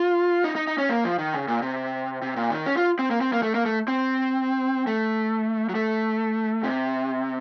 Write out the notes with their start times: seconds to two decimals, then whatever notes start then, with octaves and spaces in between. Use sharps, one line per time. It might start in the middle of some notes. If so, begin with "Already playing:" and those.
Already playing: F4
0.44 D#4
0.55 D#4
0.67 D#4
0.78 C#4
0.89 A#3
1.04 F3
1.19 D#3
1.34 C#3
1.48 A#2
1.62 C3
2.22 C3
2.36 A#2
2.50 D#3
2.66 C#4
2.77 F4
2.99 C4
3.11 A#3
3.21 C4
3.33 A#3
3.43 A3
3.55 A#3
3.66 A3
3.88 C4
4.87 A3
5.69 F#3
5.75 A3
6.63 C3